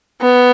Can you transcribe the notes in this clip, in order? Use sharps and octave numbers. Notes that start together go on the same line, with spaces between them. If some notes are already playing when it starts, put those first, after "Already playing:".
B3